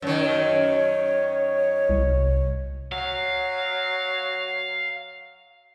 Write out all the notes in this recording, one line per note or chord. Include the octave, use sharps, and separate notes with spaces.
F#2 D#3 C#5
C2
F#3 F5